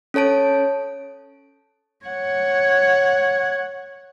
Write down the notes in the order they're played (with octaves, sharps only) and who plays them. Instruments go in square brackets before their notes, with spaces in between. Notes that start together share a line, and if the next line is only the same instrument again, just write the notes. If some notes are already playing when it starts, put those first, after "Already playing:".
[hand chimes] C#4 A4 C#5 A5 D7
[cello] C#5 F#5